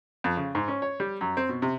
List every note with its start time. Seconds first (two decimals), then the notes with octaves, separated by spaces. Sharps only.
0.24 F2
0.37 C#3
0.55 G#2
0.68 C#4
0.82 C#5
1.00 G3
1.21 F#2
1.37 C4
1.49 B2
1.62 C3